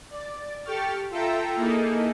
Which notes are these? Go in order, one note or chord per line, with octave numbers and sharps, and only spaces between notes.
D5
G4 A4 G5 C#6 F6 A6
F4 A4 E5 G5 A#5 E6
A#3 D#4 E4 G#4 A4